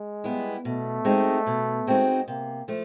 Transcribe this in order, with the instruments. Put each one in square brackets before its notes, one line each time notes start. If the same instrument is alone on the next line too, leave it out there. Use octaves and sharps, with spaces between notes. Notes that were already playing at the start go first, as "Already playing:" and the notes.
Already playing: [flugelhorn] G#3
[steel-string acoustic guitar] G3 B3 E4
[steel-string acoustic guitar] B2 [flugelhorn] A3
[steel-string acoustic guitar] G#3 C4 D#4 F#4
B2
G#3 C4 D#4 F#4
[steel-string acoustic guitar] C3 [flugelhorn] A#3
[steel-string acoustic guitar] F3 A3